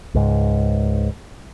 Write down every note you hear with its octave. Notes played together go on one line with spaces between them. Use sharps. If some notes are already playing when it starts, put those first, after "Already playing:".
C#2 G#2